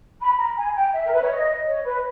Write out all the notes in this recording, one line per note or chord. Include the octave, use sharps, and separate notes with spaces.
B5
A#5
G#5
G5
E5
A#4
B4
C#5
D#5
C#5
B4